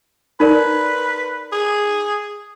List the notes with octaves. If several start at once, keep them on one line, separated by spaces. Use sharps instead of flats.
D#4 A#4 B4 D5
G#4